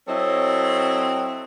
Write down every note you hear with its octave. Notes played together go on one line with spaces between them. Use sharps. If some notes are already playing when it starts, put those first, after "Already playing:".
F#3 C4 E4 A4 C#5 D#5